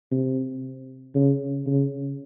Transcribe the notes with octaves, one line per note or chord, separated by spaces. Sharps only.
C3
C#3
C#3